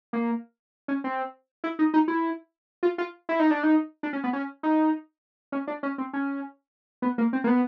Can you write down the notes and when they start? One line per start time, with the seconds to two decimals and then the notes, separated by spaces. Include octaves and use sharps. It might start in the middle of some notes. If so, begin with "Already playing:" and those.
0.13 A#3
0.88 C#4
1.04 C4
1.64 E4
1.79 D#4
1.94 D#4
2.08 E4
2.83 F4
2.98 F4
3.29 E4
3.40 D#4
3.51 D4
3.63 D#4
4.03 D4
4.13 C#4
4.24 B3
4.33 C#4
4.63 D#4
5.52 C#4
5.67 D4
5.83 C#4
5.98 C4
6.13 C#4
7.02 B3
7.18 A#3
7.33 C4
7.44 A#3
7.48 B3